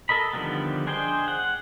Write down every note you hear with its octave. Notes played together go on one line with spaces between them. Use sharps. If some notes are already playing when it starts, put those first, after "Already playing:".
A4 A#4 D#5 B5
D3 D#3 F3 G3 B3
D4 G#4 C5 D#5 G5
F#5